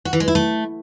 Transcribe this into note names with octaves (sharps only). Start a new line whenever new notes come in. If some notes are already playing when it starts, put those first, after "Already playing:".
F#4
E3
G#3
E4
A3